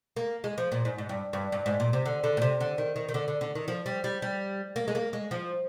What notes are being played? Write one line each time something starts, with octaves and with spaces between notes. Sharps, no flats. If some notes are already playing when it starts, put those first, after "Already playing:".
A#3
G#3
F3
A#2
G#2
G#2
G2
G2
G2
G#2
A#2
C3
D3
D3
A#2
C3
D3
D#3
D#3
D#3
D3
D3
D3
D#3
F3
G3
G3
G3
A#3
G#3
A#3
G#3
F3